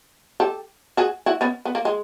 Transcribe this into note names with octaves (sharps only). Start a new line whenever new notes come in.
G4 A4
F#4 G#4
E4 F#4
B3 C#4
B3
A#3
G#3